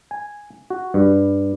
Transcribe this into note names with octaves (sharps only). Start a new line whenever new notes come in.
G#5
F#4
G2